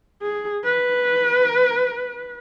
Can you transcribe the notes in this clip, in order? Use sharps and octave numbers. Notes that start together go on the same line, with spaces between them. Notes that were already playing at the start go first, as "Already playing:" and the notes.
G#4
B4